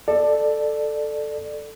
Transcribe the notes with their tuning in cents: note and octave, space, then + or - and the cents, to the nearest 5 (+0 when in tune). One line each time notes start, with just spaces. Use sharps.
A4 +0 D5 +20